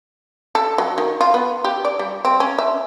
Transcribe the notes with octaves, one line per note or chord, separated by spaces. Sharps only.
A4
F#3
D#3
F4
B3
G4
D5
G3
C4
C#4
E5